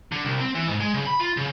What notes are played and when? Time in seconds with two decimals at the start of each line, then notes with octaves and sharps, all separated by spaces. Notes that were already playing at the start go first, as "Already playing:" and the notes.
0.12 D3
0.25 C2
0.40 C4
0.55 E3
0.67 G#2
0.80 G#3
0.94 C#3
1.07 B5
1.20 F4
1.37 C#3